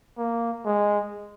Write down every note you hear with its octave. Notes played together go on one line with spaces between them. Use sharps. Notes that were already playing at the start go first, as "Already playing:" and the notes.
A#3
G#3